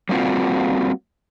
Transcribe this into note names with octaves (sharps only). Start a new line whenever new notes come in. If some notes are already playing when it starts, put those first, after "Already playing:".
G3 A#3 C4 F4 F#4